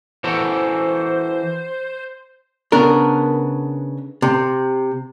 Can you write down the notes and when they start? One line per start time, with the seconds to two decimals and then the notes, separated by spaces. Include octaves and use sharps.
0.24 E3 F#4 A4 C5
2.72 C#3 B3 D4 A#4
4.22 C3